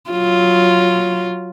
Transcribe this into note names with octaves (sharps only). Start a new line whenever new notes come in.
F#3 F4